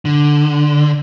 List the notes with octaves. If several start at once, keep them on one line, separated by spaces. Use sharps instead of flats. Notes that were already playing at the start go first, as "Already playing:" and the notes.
D3